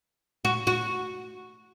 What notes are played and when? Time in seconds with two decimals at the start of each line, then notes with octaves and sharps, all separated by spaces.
0.45 F#4
0.67 F#4